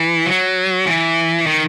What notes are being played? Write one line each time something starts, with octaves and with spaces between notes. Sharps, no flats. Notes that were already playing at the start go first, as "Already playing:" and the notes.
Already playing: E3
F#3
E3
D#3